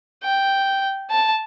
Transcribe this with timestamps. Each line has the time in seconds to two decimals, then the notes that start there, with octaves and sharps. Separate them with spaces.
0.23 G5
1.10 A5